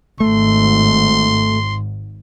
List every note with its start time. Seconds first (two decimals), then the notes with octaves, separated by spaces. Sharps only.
0.20 G#1 G#2 A3 C6